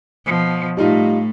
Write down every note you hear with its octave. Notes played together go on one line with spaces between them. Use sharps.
B2 F3
A2 G3 A3 D#4 F4